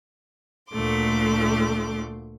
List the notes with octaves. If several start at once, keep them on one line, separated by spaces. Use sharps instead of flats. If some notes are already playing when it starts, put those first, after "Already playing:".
D2 A#2 A3 C6 D6